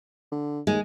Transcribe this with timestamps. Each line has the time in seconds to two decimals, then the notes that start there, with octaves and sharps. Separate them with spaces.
0.32 D3
0.67 D#2 G#3